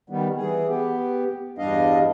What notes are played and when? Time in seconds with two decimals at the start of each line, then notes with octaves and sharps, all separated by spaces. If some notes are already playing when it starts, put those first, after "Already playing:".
0.10 D#3 G3 B3
0.37 E3 G#4
0.68 B3 G4
1.58 E2 G2 G3 D4 D#5 F5